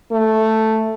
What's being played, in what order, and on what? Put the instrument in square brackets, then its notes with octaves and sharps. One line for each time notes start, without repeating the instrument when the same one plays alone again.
[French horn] A3